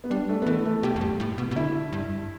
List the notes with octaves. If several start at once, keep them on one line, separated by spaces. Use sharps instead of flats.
B3
G3 D4
A3
B3
E3 A3
A3
B2 G4
E2
G2
A2
B2
B2
D3 E4
G2